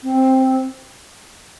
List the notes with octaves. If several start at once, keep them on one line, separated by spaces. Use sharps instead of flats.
C4